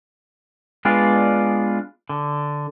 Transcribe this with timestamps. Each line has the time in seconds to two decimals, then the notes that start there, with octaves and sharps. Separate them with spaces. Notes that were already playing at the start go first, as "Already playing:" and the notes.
0.85 G#3 B3 D4 F4 D5
2.09 D3